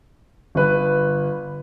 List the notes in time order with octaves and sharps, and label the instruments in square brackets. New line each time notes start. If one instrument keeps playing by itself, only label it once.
[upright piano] G1 B4